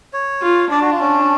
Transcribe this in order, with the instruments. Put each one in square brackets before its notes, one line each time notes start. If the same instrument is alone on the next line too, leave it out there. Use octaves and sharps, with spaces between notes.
[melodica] C#5
[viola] F4
[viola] D4 [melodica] D5
[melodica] F#4
F4
[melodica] C#4 [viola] D4